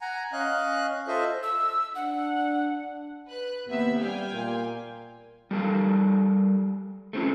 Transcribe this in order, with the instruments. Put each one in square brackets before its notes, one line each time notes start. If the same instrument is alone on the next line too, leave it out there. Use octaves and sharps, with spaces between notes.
[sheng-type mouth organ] F#5 G#5 A#5
C#4 D#5 F5 F#6
F4 A4 C5 D#5 E5
[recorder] E6
[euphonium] D4 [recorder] F#5
[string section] B4 F#6
[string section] D#2 C3 E5 [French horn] B3
[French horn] G3 [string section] F5 G5 G#5
[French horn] A#2
[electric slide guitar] G3 A4 A#4 F5
A3 C4 C#4 F4